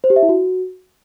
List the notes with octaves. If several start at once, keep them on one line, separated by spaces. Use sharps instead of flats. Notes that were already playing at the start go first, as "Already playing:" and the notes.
C5
G4
E5
E4
F#4